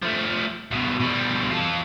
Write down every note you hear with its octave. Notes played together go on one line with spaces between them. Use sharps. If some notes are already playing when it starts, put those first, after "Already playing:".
F3 A3
C2 B2
B2 G3
F4 A4